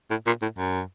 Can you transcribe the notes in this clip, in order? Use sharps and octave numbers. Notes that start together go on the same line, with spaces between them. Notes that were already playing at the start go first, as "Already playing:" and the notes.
A2
A#2
A2
F#2